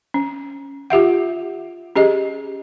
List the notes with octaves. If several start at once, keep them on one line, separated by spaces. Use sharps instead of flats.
C#4
F4 G4 E5 F#5
C#4 G4 G#4 D#5